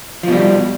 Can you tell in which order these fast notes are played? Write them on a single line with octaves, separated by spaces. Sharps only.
F3 B2 G3